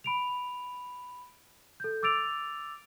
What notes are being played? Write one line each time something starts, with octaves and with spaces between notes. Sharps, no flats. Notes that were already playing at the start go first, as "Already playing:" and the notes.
B5 D7 F7
A4 G6
D6 E6 A6 D7 F7